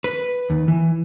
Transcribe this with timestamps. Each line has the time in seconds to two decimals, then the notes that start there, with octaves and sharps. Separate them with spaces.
0.04 B4
0.50 D#2
0.68 E3